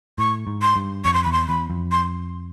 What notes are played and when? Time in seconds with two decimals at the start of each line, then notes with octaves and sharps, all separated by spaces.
0.18 A2 C#6
0.47 G#2
0.62 C6
0.76 G2
1.05 F2 C#6
1.14 C6
1.24 E2 B5
1.32 C6
1.48 E2 B5
1.70 F2
1.92 C6